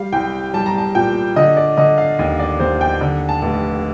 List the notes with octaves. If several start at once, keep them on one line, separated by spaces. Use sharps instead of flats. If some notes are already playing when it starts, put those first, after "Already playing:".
Already playing: G3 F5
C2 G5
G3 A5
A#5
A5
A#2 G5
D3 D#5
D5
D3 D#5
F5
D#2
D5
D#2 C5
G5
D3
A5
F1